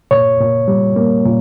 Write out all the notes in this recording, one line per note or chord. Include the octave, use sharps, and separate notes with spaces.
A#2 C#5
A#2
G3
A#3
A#2